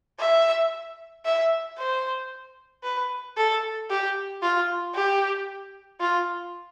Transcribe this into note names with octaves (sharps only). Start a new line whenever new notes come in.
E5
E5
C5
B4
A4
G4
F4
G4
F4